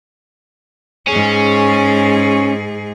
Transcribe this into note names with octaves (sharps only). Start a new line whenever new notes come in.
G#2 C#4 G#4